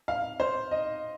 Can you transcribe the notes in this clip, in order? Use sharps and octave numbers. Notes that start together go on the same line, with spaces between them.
F5
C5
D#5